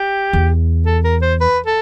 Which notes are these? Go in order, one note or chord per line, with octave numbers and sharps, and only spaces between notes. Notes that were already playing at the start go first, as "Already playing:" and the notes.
Already playing: G4
E2
A4
A#4
C5
B4
A4